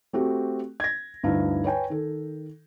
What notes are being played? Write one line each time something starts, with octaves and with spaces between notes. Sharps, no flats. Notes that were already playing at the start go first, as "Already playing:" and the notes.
A3 C4 F#4 G4
G#6 A#6
D2 G2 D#4 E4 F5
B4 C#5 G5 G#5
D#3 A4